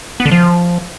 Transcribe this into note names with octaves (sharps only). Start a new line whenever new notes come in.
B3
D3
F3